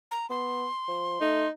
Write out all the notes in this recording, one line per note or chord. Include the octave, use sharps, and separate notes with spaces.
A#5
B3 C6
F3
A3 D#4